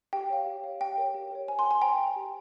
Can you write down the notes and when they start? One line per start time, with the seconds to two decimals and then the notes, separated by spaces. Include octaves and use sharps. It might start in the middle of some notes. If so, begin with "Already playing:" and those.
0.13 G4 G5
0.30 C#5 F5
0.46 G4
0.64 C#5 F5
0.80 G4 G5
0.97 A#4 C#5
1.15 G4
1.31 A#4 C#5
1.48 C5 G#5
1.59 G#5 C6
1.65 G5
1.71 G#5 C6
1.82 C5 G5 A#5
1.99 G5
2.16 G4